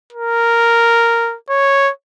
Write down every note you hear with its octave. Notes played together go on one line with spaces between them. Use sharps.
A#4
C#5